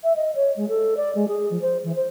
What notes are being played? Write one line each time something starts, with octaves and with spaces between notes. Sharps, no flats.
E5
D#5
C#5
G#3
A4
D5
G#3
G#4
F3
C5
E3
C5